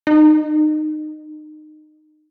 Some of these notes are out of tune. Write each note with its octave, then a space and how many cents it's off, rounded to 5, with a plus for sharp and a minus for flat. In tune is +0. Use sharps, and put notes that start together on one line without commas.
D#4 -25